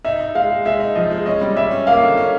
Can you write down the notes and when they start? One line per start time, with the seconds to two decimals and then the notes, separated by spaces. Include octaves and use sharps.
0.05 D#4 E5
0.20 D#4
0.35 G#3 F5
0.51 G#3
0.65 G#3 E5
0.80 D#4
0.95 F3 D#5
1.11 G#3
1.26 C#4 D#5
1.41 G3
1.56 G3 E5
1.71 C#4
1.87 A#3 F5
2.02 D3
2.17 C#4